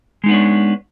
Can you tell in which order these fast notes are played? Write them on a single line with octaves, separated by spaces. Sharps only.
G#3 D#4 B3 D4 C#5